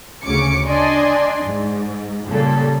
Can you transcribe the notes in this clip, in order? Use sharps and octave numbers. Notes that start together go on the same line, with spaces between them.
D2 C#3 C#4 D6 C#7
D4 D5 D#5 G#5 C6
G#2
A#2 C#3 G3 A4